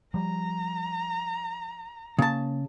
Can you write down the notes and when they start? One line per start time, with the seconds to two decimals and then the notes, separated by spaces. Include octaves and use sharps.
0.14 F3 G3 A#5
2.19 C#3 A#3 A5